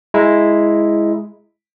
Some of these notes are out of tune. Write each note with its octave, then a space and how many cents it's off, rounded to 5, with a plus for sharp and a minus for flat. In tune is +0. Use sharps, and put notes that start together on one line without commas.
G#3 +0 E4 +0 A#5 +0